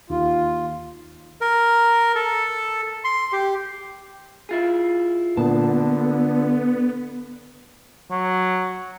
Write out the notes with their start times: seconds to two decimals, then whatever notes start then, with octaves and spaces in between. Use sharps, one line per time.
0.10 D#2 F4
1.41 A#4
2.15 A4
3.04 C6
3.32 G4
4.49 E4 F4 G#4
5.37 A#2 D3 B3 A5
8.11 F#3